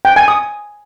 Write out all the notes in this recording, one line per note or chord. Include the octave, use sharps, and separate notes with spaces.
G5
G#5
D#6